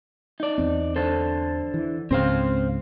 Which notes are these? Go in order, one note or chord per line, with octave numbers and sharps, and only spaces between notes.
D#4 D5
E2 C4
D3 A4 C5
E3
C#2 G#2 C#3 C4 C5 F5